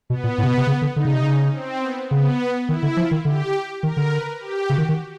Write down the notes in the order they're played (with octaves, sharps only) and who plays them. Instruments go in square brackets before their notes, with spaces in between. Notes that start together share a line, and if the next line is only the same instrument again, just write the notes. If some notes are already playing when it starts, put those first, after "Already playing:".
[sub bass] B2 [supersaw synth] B3
[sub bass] A#2
A2
C3
B2
C3
C#3
D3
[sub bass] D3 [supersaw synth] D#4
[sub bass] C#3
C3
[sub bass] C#3 [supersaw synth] C#4
[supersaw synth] C4
B3
[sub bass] C#3 [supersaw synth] B3
[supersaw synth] B3
[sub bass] D#3 [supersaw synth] E4
[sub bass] D3
[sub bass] F3 [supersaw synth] F4
[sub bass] D#3
[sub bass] D3 [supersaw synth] G4
[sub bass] D#3 [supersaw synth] A#4
[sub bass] D3
[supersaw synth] B4
G4
[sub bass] C#3 [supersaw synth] F#4
[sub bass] D#3
D#3